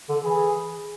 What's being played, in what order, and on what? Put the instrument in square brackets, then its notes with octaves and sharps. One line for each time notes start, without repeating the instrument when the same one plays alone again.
[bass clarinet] D3
[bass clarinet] E3 [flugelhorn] G#4